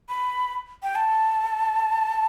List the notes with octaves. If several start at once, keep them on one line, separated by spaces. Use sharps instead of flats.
B5
G5
A5